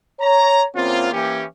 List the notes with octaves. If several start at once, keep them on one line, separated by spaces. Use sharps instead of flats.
C#5 A#5
E2 A#3 C4 C#4 F4
E3 A#3 C#4 G4